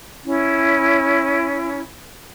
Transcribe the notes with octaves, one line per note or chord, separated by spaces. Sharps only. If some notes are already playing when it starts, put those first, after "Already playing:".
C#4 E4